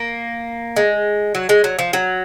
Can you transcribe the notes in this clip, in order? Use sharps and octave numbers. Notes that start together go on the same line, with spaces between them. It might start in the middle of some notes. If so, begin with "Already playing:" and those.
Already playing: A#3
G#3
F#3
G#3
F#3
F3
F#3